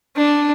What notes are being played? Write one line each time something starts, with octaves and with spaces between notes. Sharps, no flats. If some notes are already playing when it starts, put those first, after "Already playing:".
D4